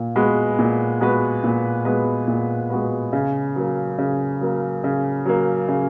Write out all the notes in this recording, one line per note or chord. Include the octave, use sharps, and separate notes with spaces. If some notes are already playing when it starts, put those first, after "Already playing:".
Already playing: A#2
G#3 B3 F#4 B4
A#2
G#3 B3 F#4 B4
A#2
G#3 B3 F#4 B4
A#2
G#3 B3 F#4 B4
C#3
F#3 A#3
C#3
F#3 A#3
C#3
F#3 A#3
C#3